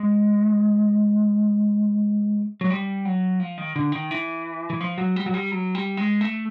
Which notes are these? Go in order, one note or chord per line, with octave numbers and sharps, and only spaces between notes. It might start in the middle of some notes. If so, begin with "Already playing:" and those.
Already playing: G#3
F#3
G3
F#3
F3
D#3
D3
D#3
E3
E3
F3
F#3
G3
F#3
G3
F#3
G3
G#3
A3